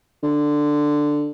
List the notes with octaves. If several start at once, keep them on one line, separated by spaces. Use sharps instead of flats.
D3